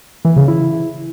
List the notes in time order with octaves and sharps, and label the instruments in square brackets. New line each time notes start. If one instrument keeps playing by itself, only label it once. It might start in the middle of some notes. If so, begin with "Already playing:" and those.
[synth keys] E3
C#3
E4